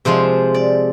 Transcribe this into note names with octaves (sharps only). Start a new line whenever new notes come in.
C3 F3 G#3 C5
D5